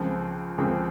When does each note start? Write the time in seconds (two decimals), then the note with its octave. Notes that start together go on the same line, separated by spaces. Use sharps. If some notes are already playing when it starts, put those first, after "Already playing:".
Already playing: C#2 C#3 F3 C4
0.58 C#2 C#3 F3 C4